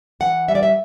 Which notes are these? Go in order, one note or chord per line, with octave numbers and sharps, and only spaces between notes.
E3 F#5
G3 E5
D5
E5